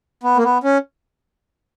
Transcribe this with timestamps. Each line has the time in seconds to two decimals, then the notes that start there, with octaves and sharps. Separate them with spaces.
0.23 B3
0.37 A#3
0.44 B3
0.64 C#4